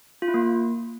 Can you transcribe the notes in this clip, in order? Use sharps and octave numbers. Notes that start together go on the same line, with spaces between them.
F4
E4
A#3